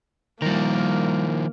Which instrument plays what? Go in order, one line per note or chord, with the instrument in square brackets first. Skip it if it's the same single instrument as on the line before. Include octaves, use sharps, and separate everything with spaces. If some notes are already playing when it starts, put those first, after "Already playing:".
[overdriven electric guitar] D#3 F3 [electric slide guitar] G3 A#4 [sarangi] A#3